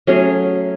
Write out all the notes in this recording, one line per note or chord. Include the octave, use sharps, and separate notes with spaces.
F#3 A3 C#4 G#4